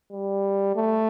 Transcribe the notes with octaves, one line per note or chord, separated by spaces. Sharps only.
G3
A3